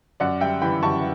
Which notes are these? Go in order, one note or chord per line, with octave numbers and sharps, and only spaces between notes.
F#2 D5 F#5
G3 E5 G5
E3 G5 B5
F#2 A5 C#6